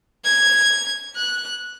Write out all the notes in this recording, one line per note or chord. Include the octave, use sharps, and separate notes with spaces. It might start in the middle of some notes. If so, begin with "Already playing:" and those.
G#6
F#6